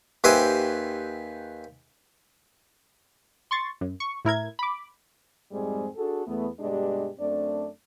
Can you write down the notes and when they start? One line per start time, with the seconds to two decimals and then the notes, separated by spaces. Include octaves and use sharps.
0.24 D#2 G4 B4 C5 E5 G#5
3.51 C6 C#6 A6
3.81 F#2
4.00 C#6
4.25 A2 E4 A#4 G#6
4.59 B5 D6
5.52 F2 G#2 G3 G#3 C4 G#4
5.96 D4 F#4 G#4 A4
6.27 E2 A3 B3
6.60 G2 B2 G#3 D4 G4
7.19 F#2 A3 C4 D4 D5